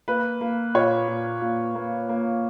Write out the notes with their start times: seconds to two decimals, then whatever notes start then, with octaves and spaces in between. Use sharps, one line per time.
0.08 A#3 B4
0.41 A#3
0.75 A#2 C#5
1.08 A#2
1.42 A#2
1.75 A#3
2.09 A#3